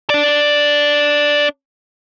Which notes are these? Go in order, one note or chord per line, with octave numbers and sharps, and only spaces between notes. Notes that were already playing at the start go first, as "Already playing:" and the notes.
D4 D5